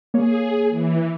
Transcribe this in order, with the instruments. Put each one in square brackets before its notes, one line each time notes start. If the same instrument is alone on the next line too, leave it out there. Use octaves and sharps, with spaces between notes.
[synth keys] A#3 C#5 [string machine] G#4
[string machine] E3